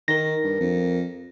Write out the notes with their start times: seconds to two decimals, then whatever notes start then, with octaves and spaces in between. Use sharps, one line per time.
0.08 D#3 A#4 A#6
0.44 G2
0.61 F2